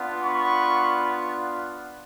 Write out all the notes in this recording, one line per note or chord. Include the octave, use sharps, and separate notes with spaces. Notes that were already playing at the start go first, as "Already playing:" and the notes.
Already playing: B3 D4 F4
B5 C#6